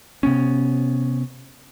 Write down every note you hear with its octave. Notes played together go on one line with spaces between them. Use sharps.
C3 B3 C#4